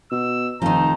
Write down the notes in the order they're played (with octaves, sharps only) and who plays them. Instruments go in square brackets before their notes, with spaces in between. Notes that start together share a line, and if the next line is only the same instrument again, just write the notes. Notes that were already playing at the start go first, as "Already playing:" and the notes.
[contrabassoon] B2 [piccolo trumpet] E6
[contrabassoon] F1 [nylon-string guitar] D#3 F3 [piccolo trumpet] A#5